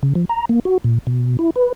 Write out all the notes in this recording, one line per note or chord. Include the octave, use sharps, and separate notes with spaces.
C#3
F3
A#5
A#3
F#4
A#2
B2
E4
B4